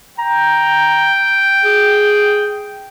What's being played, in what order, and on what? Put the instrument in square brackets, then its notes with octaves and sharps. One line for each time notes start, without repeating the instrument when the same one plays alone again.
[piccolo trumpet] G5 [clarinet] A#5
[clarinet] G#4